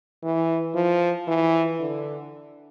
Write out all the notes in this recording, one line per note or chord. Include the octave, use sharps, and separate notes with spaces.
E3
F3
E3
D3